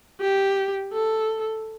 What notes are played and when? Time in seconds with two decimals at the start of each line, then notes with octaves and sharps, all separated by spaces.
0.20 G4
0.93 A4